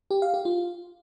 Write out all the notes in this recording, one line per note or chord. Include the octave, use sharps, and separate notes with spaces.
G4
F5
G4
F4